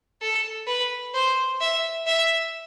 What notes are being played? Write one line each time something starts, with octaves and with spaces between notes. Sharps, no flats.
A4
B4
C5
E5
E5